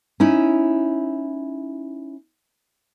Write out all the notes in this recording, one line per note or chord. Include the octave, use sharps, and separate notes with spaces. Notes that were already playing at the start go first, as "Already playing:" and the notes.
C#4 D#4 E4